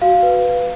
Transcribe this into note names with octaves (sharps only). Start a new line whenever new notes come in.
F#4 F5
B4
B4